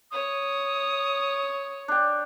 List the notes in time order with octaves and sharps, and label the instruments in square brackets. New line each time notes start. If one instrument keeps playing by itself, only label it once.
[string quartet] C#5 [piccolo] D#6
[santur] D4 G5